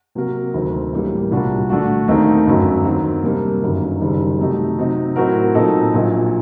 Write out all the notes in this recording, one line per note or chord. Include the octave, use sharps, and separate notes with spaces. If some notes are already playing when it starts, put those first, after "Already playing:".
C3 F#3 A#3 F#4 A#4
D2 C3 D#3 F#3 C4
A1 A2 G3 A#3
C2 A#2 G3 D4 F#4
D3 A3 D4 F#4
D#2 D#3 A3 C4 D#4
G1 F#2 F#3
D#3 F#3 C4
C3 G3 A#3 D4
G1 F#2 D#3 F#3
F#1 F#2 D#3 G3
C3 F#3 A3 D#4 G4
C3 F#3 C4 D#4
A2 F#3 C4 F#4 A#4
A#2 F#3 C4 D#4 A4
A#1 A#2 F#3